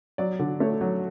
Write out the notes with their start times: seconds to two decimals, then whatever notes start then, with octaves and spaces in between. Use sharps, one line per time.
0.18 F#3 D5
0.39 D3
0.60 A3 C#5
0.81 F#3